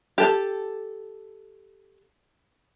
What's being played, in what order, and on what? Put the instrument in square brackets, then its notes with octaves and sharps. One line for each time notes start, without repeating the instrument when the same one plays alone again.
[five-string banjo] G4 A4